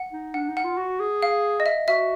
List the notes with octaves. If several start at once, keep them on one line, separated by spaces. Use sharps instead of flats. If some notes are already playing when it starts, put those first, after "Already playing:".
Already playing: F#5
D#4
D4 F#5
D#4
F#5
F4
F#4
G#4
F5
D#5
E5
F#4 E5